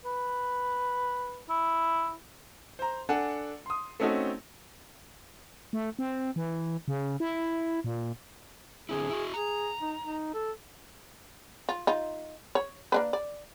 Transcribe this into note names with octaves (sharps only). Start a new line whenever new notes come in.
B4
E4
C5 A#5
D4 A4 F#5 G#5
C6 D#6
A3 C4 C#4 D#4 F#4 A4
A3
C4
E3
C#3
E4
A#2
D3 C4 E4 G#4
E4 F#4
G#4 A#5
D#4
D#4
A4
F4
D#4 F4
C#5
A#3 D4 B4
D5